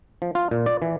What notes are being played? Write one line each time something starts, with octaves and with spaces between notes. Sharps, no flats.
F3
F4
A#2
D5
E3